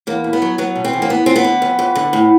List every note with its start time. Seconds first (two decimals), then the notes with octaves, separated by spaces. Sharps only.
0.07 E2 A#3
0.24 B2
0.33 B3
0.42 F#3
0.58 F#3 B3
0.76 B2
0.85 C4
0.93 E2
1.02 A#3
1.09 D3 B3
1.26 F3 C4
1.36 B3
1.44 D3
1.62 F2
1.79 F2
1.95 D3
2.13 A2